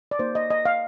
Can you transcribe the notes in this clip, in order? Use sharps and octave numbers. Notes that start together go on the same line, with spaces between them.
D5
A#3 D#4 G4 C5
D#5
D#5
F5